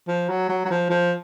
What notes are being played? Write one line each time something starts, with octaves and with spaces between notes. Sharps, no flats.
F3
F#3
F#3
F#3
F3
F3